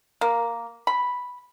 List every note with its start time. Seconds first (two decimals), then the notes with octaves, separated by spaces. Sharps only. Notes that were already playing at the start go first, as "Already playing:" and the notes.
0.21 A#3
0.87 B5